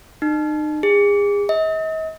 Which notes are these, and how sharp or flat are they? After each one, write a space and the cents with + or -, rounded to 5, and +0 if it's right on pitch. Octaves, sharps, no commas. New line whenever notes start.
D#4 -35
G#4 -35
D#5 +40